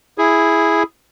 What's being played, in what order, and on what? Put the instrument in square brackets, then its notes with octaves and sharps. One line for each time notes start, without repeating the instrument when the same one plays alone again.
[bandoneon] E4 G#4